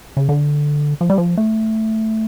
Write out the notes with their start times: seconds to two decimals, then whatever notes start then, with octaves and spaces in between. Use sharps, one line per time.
0.17 C#3
0.29 D3
1.01 F3
1.10 G3
1.18 F3
1.37 A3